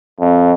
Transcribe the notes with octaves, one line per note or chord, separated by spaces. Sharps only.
F2